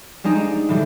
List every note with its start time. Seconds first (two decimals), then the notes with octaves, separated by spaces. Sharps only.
0.24 G3 G#3 C4 D#4
0.69 A2 D3 E3 G3